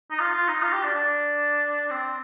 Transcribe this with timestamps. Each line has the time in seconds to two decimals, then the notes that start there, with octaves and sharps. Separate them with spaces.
0.11 D#4
0.20 F4
0.34 F4
0.48 D#4
0.63 F4
0.73 G4
0.84 D4
0.95 D4
1.91 C4